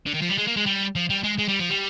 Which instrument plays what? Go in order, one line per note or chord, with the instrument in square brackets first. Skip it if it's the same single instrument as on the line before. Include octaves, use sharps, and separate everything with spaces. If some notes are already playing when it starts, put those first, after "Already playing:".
[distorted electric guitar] D3
D#3
F3
G3
G#3
A#3
G#3
G3
F3
G3
G#3
G#3
G3
F3
G3